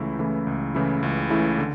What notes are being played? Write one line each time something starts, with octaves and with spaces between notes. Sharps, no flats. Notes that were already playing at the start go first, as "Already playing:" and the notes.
Already playing: C#2 C#3 E3 A3 E4
C#3 E3 A3 E4
C#2
C#3 E3 A3 E4
C#2
C#3 E3 A3 E4
D3